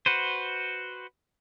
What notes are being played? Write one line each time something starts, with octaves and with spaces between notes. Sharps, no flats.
F#4 B4 C5